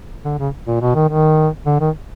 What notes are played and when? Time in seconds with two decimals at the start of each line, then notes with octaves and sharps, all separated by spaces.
0.24 D3
0.39 C#3
0.67 A#2
0.81 B2
0.95 D#3
1.09 D#3
1.66 D3
1.80 D#3